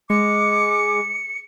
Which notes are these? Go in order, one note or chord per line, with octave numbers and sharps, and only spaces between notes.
G#3 D6 C#7